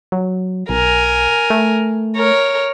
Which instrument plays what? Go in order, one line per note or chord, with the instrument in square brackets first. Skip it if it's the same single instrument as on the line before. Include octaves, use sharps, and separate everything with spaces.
[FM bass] F#3
[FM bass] B1 [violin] A#4 G#5
[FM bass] A3
[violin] A#4 C#5